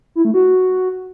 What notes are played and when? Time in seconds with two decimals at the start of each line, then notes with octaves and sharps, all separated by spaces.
0.15 E4
0.25 A3
0.34 F#4